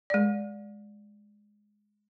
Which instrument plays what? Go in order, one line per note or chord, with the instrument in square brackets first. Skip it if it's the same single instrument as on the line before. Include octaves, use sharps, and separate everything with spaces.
[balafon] G#3 D5